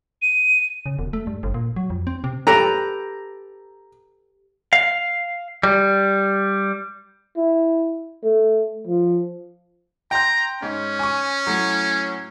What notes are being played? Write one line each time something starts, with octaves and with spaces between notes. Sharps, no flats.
D#7
C#3
E1
A3
G2
G1
A#2
F#3
F2
C4
C3
G4 A4 B4 A#5
F5
G3
E4
A3
F3
G5 A#5 C6 G6
G#2 C#4
G#5 C#6
A2 F#3